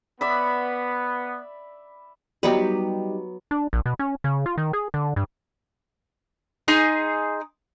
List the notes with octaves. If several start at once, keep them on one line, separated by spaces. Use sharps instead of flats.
B3 D5 E5 B5
F#3 G3 B3 D#4 G4 B4
D4
A#1
B2
C#4
C#3
F4
D#3
G#4
D3
G2
D#4 G#4 C6